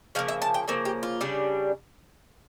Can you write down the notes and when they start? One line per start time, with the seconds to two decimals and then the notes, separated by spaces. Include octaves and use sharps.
0.15 C#3 F3 A#3 F5
0.28 E5
0.42 A5
0.54 G5
0.68 C#3 F3 A#3 A4
0.85 G4
1.03 F4
1.21 C#3 G3 D4